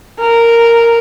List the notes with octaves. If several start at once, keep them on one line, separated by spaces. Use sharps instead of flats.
A#4